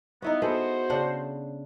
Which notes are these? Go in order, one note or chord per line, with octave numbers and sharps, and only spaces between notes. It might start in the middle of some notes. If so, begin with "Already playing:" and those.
B3 D#4 E4 F#4
B3 F#4 G#4 A4 C5
C#3 D4 F#5